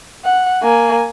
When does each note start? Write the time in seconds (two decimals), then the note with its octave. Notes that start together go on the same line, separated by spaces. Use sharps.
0.24 F#5
0.63 A#3 G#5